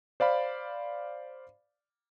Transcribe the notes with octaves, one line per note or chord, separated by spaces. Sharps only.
C5 D5 F5 B5